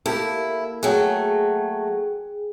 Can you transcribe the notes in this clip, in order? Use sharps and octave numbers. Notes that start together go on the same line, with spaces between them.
A#3 E4 G4 A4
F#3 A3 G#4 G5 F#6